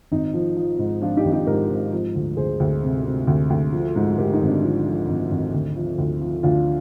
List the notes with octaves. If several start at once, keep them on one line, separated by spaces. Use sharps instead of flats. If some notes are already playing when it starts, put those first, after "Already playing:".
G#1 D#4
F3
F3
G#2
F3 D4 F4
D#4 G4
G#1
D#4 G4
G#2 G4 A#4
G#2
F3
D2
D2 G#4 C5
D2
C3
C3
D2
D2
F3
G#2
G#2 G4 A#4
D#4
G#1
D4
F3 D#4
F3
G#1
G#1
D2
F3
D2
F3
D2 D4 F4